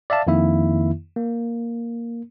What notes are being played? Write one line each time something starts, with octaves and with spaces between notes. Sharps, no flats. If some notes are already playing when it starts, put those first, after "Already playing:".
D5 E5 F5 A5
F2 D#3 A#3 E4 E5
A#3